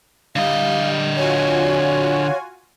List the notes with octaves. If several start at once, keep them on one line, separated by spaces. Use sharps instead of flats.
D3 G3 D#5 F5
F4 F#4 C#5 G#5